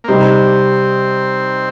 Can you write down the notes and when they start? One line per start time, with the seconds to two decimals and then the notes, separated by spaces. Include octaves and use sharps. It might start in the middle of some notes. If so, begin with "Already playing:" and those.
0.04 A#3
0.08 C3 G3 C4 D#4